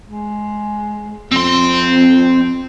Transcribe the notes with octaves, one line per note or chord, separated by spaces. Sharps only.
G#3
F2 C4 C6